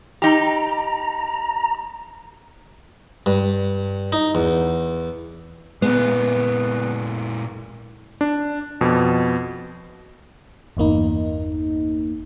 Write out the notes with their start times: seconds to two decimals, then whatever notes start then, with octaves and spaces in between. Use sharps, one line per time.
0.22 D#4 G4 A#5
3.26 G2
4.12 D#4
4.35 E2
5.82 A#2 G#3 B3
8.21 D4
8.81 F2 B2
10.77 G1 E2 A#3 D#4